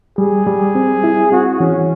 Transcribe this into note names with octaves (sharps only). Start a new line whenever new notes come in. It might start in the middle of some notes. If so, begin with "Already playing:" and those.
G3 G#4
G3
C4
E4
C4 F#4
E3 C#4